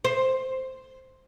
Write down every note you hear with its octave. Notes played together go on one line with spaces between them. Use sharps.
C5